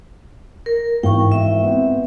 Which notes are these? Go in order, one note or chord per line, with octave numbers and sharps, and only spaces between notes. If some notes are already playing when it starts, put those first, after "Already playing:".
A#4
G#1 E3 F5 G5 C#6
E5
B3 C4